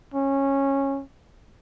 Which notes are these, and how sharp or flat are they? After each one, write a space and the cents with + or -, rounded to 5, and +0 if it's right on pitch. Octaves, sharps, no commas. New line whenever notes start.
C#4 -15